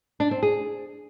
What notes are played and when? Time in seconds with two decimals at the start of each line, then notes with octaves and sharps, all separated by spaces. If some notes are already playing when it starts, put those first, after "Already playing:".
0.20 D4
0.31 C4
0.43 G#4